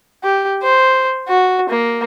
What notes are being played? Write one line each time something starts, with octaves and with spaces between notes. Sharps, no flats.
G4
C5
F#4
A#3